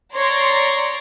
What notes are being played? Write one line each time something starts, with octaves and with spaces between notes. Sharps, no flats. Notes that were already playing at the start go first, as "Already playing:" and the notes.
C#5 D5 A#5 C6